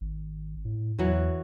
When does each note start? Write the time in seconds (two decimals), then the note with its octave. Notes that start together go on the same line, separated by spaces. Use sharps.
0.01 G#1
0.65 A2
0.99 E2 E3 F#3